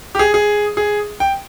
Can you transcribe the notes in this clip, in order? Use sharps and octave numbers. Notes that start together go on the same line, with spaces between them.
G4
G#4
G#4
G#4
G5